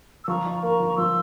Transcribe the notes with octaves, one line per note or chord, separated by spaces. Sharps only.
E6
F3 A#5 C#6
F4
A#3 A#5 C#6
F3
C#6
F3 C6 E6